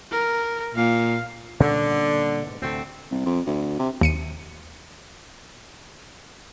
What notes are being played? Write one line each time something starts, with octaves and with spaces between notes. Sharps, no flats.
A#4
A#2 F5
A#2 D3 G3 C#4
G#2 B2
D2 A2 C3 A3 C4
C2
F2
D2
C3
D#2 C#7 D#7